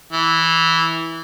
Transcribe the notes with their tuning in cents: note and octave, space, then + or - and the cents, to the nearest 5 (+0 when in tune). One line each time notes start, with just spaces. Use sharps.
E3 -10